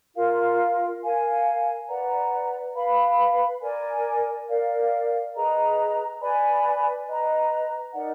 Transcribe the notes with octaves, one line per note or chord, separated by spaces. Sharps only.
F4 A#4 F5
A#4 F5 G#5
B4 D5 F#5 A#5
B4 F5 B5
A#4 D5 G#5
A#4 D5 F5
G#4 B4 D#5 A#5
B4 D5 G#5 B5
B4 D#5 A#5
D#4 A#4 D5 F#5